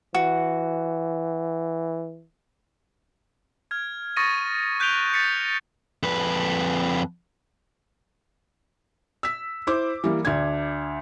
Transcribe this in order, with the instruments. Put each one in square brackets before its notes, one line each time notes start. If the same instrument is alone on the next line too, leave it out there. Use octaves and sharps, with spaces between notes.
[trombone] E3 [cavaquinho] F#4
[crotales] F6 G#6
C#6 D#6 A6 A#6 C#7 D#7
F#6 G6 B6 D7 F7 G7
A6 B6 C#7
[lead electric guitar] F2 B4
[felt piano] E6 B6
E4 C5 D6
E3 G3 A#3
D2 D4 G#6